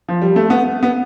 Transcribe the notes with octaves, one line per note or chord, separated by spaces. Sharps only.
F3
G3
A3
B3
B3